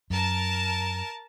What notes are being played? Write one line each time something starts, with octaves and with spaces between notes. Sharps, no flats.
F#2 A#4 A5